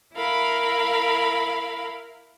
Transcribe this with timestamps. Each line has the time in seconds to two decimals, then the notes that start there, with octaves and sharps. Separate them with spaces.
0.14 E4 A#4 F5 B5